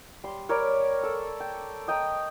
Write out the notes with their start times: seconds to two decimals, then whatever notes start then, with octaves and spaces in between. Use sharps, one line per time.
0.24 G3 C6
0.49 A#4 C#5 D5 B5
1.03 A4
1.40 G5
1.88 D#5 G5 A#5